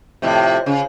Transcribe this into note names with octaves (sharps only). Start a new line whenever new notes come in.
F2 A2 C3
C#3